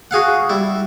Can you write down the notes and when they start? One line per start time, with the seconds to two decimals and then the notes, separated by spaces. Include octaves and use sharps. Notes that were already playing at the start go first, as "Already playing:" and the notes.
0.11 F#4 G#4 F5 F#5
0.49 G3 E4